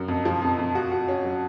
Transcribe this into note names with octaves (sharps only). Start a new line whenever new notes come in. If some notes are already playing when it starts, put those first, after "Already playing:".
Already playing: F#2
F2
F3
F2
F2
F#4
F#4
C#4
F#3